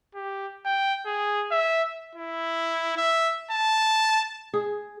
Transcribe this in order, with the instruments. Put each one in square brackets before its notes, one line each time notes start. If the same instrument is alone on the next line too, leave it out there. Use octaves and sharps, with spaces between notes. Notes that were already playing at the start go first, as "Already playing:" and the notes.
[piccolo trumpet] G4
G5
G#4
E5
E4
E5
A5
[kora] G#4